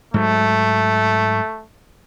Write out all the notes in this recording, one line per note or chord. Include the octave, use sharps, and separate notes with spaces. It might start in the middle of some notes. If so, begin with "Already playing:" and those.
G#2 F#3 A3